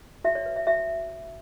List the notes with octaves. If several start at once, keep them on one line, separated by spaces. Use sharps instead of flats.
F#4 E5
C#5
B4
E5
F#4 E5